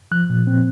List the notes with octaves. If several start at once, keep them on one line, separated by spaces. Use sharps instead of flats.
F3 F#6
A#2
C4